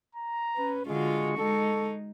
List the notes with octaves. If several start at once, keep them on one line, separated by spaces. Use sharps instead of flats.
A#5
C#4 B4
D3 G#3 F4 F#4 C#6
G#3 D#4 A4